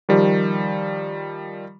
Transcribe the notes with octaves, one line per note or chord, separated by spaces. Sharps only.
D#3 F3 G3